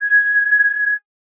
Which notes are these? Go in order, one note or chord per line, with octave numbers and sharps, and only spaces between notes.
G#6